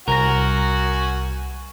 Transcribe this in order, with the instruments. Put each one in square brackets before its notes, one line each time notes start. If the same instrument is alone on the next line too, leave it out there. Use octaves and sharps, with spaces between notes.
[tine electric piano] C2 A#6 [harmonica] F#4 F#5 G#5 [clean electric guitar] A#4